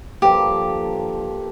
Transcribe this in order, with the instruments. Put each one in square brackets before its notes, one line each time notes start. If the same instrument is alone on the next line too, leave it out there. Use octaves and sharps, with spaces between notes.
[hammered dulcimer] G2 D3 F3 A#3 [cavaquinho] G4